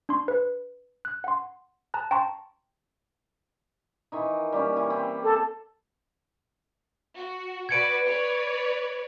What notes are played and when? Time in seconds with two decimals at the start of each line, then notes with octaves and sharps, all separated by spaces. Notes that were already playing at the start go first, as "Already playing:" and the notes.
0.09 D4 C6 C#6
0.28 B4
1.05 F#6
1.24 F#5 C6
1.94 A5 A#5 F#6
2.11 G5 A5 A#5 C6 C#6
4.12 D#3 E3 D#4
4.52 G3 A#3 C#4
4.77 E3
4.90 C4 E4
5.23 A4
7.15 F#4
7.69 F#4 B4 D5 G#6 C#7 D7
8.05 B4 C#5 D5